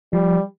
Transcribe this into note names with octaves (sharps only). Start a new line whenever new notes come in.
F3 G3